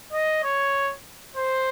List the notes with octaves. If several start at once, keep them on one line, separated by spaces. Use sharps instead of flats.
D#5
C#5
C5